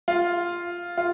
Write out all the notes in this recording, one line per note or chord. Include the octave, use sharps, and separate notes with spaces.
F4
F4